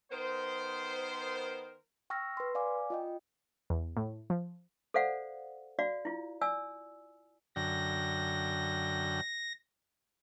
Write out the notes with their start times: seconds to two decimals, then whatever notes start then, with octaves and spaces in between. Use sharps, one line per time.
0.11 D#3 B3 A#4 C5
2.10 G5 C#6 E6 F6 A#6
2.37 B4 C6
2.55 D5 F5 G#5 D6
2.90 F4 D#5 G5
3.70 E2
3.97 A2
4.30 F3
4.94 A4 C5 D5 F5 F#5
5.79 F#4 D5 F5
6.05 E4 F4
6.41 D5 G#5 E6
7.56 F#2 D3 G5 A#6